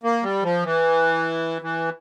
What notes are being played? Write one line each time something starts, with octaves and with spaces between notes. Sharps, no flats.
A#3
G3
F3
E3
E3